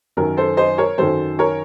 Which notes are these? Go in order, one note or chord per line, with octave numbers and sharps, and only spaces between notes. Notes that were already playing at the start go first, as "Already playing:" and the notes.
F#2 D#3 F#3 A#4
A4 C5
C5 D#5
A#4 C#5
F#2 D#3 F#3 A4 C5
A#4 C#5